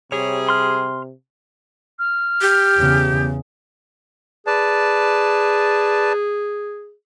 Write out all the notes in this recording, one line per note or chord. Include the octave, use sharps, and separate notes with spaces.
C3 G3 G#4 C#5
C6 F6
F6
G4
E2 C#3
G#4 B4 D5 A5